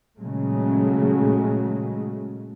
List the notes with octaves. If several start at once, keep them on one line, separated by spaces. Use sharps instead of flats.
A#2 C#3 F#3 G#3 A3